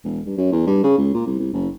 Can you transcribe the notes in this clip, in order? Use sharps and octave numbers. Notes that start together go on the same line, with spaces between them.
E1
G2
F#2
E2
G2
C#3
C#2
A#2
C2
C2
F#1